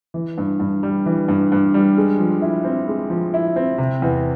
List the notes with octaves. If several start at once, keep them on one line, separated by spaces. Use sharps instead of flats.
E3
G2
G2
G3
E3
G2
G2
G3
G#3
F3
E4
C4
G#3
F3
E4
C4
C3
E2